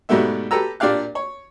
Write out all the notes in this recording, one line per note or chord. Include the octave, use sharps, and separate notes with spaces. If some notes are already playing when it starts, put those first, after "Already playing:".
G#2 B2 G3 A3 B3 E5
G4 A4 B4 A#5 E6
A#2 D4 G4 D5 F5 F#6
C#5